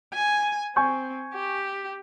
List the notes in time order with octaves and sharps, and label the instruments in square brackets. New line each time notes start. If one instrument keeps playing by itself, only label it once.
[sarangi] G#5
[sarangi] C4 [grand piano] G#5 C#6 G6
[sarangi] G4